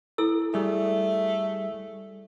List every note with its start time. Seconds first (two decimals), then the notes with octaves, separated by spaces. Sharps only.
0.18 E4 A4 E6
0.54 G3 A3 G#4